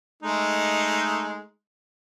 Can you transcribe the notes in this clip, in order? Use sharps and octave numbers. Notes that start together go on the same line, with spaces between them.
G#3 A3 D#4